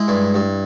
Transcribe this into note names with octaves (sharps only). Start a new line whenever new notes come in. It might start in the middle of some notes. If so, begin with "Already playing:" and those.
Already playing: G#3 E4
G2
G2